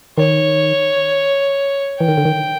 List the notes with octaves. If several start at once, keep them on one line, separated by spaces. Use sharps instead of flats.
D#3 C#5
E3 G5
D#3
D3
D#3